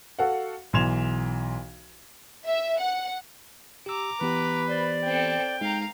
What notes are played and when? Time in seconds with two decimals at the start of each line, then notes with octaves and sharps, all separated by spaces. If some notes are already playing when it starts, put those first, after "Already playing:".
0.19 F#4 A4 F5 F#5
0.73 B1 E3 C6 G#6 E7 F7
2.47 E5
2.80 F#5
3.86 G4 A#5 D6 E6
4.21 E3 B3 G4 B4
4.68 C5 D5
5.05 C4 A4 G5
5.61 G#3 D#4 F5 A#5